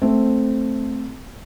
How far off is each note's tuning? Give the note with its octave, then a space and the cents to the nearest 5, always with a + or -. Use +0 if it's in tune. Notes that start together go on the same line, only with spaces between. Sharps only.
A3 +0 C4 +0